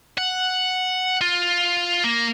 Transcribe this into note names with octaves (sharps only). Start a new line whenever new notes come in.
F#5
F4
A#3